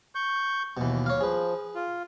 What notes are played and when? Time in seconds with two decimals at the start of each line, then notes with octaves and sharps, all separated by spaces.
0.15 C#6 G6
0.77 D#2 B2 E3
1.06 C#5 F5
1.21 F3 G#4 B4
1.75 F4